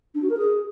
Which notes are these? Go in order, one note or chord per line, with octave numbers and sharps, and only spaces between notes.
D4
F#4
A#4
G#4